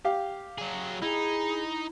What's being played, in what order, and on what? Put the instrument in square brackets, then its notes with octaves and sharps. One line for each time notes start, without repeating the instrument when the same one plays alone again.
[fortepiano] G4 F5
[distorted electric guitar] F#3 G#4
[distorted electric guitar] D#4 [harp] E4 [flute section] G#4